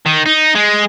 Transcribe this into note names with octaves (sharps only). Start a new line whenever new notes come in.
D#3
D#4
G#3